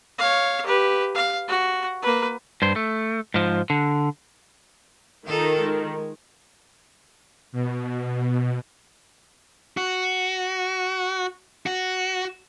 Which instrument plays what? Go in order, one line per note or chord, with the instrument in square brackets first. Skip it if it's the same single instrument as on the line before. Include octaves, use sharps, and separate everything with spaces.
[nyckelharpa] C#5 F5
G4 B4
F5
F#4
A#3 B4
[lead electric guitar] G2 C5
A3
G#2 F3
D3
[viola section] D#3 [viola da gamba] D#4 F4 A4
[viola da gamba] G#3
[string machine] B2
[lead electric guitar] F#4
F#4